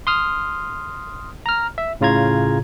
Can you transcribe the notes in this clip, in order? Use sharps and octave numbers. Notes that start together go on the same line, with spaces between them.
C6 D#6 F6
A#5 F6
E5
A2 C#3 F4 A#5 G#6